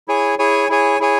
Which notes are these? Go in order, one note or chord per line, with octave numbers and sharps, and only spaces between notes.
E4 G#4 C#5 G#5
E4 G#4 C#5 G#5
E4 G#4 C#5 G#5
E4 G#4 C#5 G#5